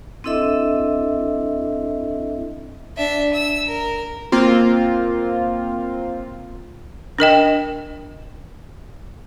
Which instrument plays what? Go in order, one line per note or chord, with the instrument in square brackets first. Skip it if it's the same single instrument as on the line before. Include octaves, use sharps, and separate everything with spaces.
[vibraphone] C4 D4 E4 A4 D#5 E5
[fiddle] D4 E5
E6
A#4
[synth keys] A#3 C4 F4
[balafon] D4 A#4 D#5 G5